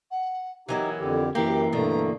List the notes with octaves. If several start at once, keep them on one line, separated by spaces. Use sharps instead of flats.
F#5
E3 F#3 B3 D#4 G4 A#4
F2 D3 G4
F#2 E3 A#3 G4 G5
G2 B2 D3 A3 A#5